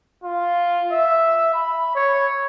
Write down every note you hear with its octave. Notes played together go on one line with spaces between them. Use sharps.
F4
E5
B5
C#5